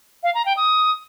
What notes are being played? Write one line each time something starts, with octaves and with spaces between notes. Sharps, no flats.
F5
A#5
G5
D#6